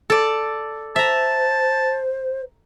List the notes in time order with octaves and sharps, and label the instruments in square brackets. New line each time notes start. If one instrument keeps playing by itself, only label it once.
[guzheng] A4 D5
[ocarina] C5 [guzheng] E5 A#5 [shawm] A5